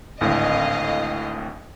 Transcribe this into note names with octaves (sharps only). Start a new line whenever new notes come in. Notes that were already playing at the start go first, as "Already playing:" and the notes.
G#1 D2 A2 D#5 F5